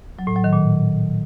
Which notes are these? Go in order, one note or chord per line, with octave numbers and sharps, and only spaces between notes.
F#3
A2
F#3
D#3
A#2